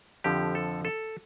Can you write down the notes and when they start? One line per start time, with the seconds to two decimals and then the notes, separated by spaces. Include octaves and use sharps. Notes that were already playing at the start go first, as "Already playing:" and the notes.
0.24 F2 D3 F3 G4
0.55 A4
0.85 A4